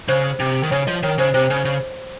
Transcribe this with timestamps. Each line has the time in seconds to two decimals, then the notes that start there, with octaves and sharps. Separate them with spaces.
0.08 C#3 C5
0.40 C3
0.63 D#3
0.71 C#3 C#5
0.87 F3 D#5
1.03 D#3 C#5
1.18 C#3 C5
1.34 C3 C5
1.50 C#3
1.65 C#3